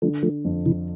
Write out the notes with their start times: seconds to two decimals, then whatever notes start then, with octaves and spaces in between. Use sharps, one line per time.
0.02 D3 F3 A3
0.23 F3 A3
0.45 F2
0.66 C3 E3